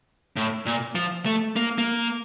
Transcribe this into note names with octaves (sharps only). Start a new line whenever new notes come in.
A2
A#2
F3
A3
A#3
A#3